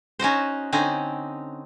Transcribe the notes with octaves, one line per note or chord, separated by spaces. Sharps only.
C#4 D#4 F#4 C5
D3 C4 C#4 D#4